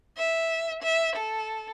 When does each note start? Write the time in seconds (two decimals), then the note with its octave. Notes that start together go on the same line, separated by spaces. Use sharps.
0.17 E5
0.83 E5
1.16 A4